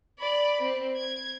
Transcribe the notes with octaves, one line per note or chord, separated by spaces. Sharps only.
D5 B5
C4
G#6